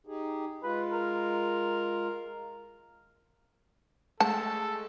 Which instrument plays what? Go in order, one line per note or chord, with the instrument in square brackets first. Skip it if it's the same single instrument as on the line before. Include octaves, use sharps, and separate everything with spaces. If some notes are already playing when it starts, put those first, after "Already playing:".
[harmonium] D#4 G4 G#4
[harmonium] G#3 F4 [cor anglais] B4
[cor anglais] A#4
[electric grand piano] G#3 A3 [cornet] A4 [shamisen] A5